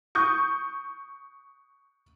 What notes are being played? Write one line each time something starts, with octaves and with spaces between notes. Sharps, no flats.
C#6 D#6 G6